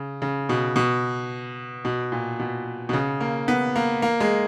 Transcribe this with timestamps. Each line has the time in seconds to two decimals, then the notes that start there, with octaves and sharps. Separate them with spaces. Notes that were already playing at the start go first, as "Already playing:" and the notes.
Already playing: C#3
0.22 C#3
0.49 B2
0.76 B2
1.85 B2
2.12 A#2
2.39 B2
2.89 B2
2.93 C#3
3.20 A#3
3.48 B3
3.76 A#3
4.02 A#3
4.20 G#3